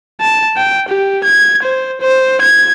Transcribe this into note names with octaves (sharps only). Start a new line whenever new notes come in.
A5
G5
G4
G#6
C5
C5
G#6